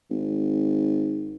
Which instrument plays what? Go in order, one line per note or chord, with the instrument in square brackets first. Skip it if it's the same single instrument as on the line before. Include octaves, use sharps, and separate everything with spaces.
[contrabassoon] G#1